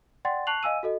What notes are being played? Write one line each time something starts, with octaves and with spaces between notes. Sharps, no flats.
D5 F#5 G5 C6 A6
A5 C#6 F#6 C7 F7 F#7
D#5 F5 G#5 E6 D#7
F#4 A4 D#5